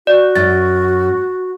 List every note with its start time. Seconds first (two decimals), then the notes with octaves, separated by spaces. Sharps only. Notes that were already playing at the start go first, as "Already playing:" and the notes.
0.07 F#4 D5
0.35 F#2 A6